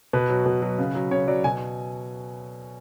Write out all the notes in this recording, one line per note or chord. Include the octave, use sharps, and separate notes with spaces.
B2 B4
F#3
B2
F#3
C#3
F#3
C#3 C#5
F#3 D5
B2 G#5